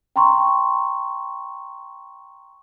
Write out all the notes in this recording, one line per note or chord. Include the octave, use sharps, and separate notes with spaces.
G5 A#5 C6 C#6